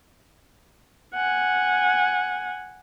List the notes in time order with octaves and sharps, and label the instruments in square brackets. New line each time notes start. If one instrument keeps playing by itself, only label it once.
[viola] F#5 G#5